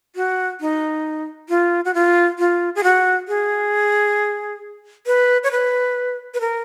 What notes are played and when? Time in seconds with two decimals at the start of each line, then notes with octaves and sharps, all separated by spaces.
0.16 F#4
0.61 D#4
1.49 F4
1.85 F#4
1.94 F4
2.38 F4
2.75 G#4
2.83 F#4
3.28 G#4
5.06 B4
5.43 C#5
5.51 B4
6.34 B4
6.41 A#4